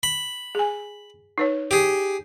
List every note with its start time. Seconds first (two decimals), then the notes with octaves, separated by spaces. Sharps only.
0.03 B5
0.55 G#4 G#5
1.38 D#4 B4 C#5
1.71 G4 G#4